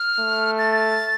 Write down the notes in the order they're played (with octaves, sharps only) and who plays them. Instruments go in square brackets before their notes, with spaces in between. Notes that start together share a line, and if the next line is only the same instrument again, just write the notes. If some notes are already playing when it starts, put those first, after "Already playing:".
Already playing: [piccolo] F6
[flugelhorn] A3
[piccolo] A6